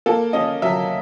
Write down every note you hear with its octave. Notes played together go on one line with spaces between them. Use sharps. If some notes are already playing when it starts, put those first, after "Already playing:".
A#3 A4
C#4 D#5
F#3 E5